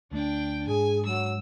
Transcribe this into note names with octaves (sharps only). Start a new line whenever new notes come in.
D2 A3 D4 G5
G#2 G#4 G#5
F#3 E6